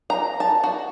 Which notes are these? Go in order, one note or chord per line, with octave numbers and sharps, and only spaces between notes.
A#5
A5
F#4